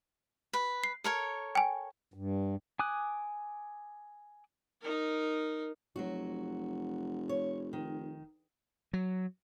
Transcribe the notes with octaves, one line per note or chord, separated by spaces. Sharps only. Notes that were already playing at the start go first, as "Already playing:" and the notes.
B4
C7
A4 A#4 C#5
G5 G#5
G2
G#5 D6 D#6 F#6
D#4 A#4
F1 F#3 F#4
C#5
D#3
F#3